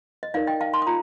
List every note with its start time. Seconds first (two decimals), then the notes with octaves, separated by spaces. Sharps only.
0.23 D#5
0.34 D#4 A#4 D5 F5
0.47 D#5 G5
0.61 F5 A5
0.74 A5 C6
0.82 D#6
0.87 F4 A#5